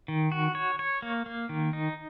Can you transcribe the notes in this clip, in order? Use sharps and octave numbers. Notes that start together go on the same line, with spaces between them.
D#3
F#4
C#5
C#5
A#3
A#3
D#3
D#4